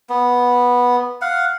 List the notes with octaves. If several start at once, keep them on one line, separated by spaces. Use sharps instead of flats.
B3
F5 F#5